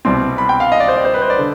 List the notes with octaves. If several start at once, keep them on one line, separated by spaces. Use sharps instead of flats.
C2 B2 G3 C4 C6
B5
G5
F5
D#5
D5
C5
D5
C5
B4
C5
D5
D3